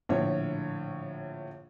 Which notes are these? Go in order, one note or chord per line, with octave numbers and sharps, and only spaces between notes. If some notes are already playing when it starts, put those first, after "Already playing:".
A#1 A2 D3 C#5